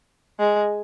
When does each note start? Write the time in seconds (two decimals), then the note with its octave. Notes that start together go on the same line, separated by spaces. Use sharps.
0.39 G#3